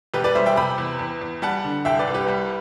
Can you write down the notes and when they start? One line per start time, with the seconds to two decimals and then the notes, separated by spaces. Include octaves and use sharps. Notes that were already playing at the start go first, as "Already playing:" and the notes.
0.14 E1 G4 B4
0.24 B4 D5
0.35 G3 C5 E5
0.46 E5 G5
0.56 C3 G5 B5
0.78 E2
0.99 E2
1.21 E2
1.42 G3 F#5 A5
1.64 D3
1.85 C2 E5 G5
1.99 B4 D5
2.07 C2
2.14 G4 B4
2.28 G3